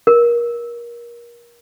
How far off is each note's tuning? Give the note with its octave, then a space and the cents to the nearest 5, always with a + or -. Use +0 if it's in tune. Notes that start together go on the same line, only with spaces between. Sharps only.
A#4 +25